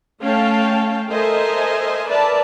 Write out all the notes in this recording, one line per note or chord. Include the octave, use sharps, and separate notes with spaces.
A3 C#4 F5 G5 A5
A4 A#4 C5 D#5 E5 G#5
A#4 B4 D5 E5 A5